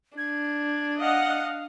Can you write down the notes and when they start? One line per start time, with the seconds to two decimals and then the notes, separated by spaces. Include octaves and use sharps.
0.17 D4 G#6
0.99 D#5 F5 F#5